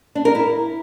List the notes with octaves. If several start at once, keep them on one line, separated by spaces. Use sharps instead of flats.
D4
A#4
E4